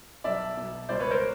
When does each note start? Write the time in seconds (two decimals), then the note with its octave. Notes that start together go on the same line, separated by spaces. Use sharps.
0.24 B1 B2 D5 E5
0.57 B1 B2
0.89 C#2 B2 C5 D5
1.00 B4 C#5
1.10 A#4 C5